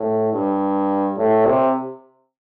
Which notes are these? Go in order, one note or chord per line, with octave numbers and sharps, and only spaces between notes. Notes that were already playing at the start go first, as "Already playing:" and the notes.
Already playing: A2
G2
A2
C3